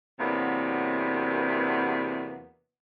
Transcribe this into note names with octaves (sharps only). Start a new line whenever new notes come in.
E2 C3 F#3 A#3 B3 D4